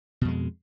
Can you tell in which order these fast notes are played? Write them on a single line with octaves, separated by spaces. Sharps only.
B2 F2 G#3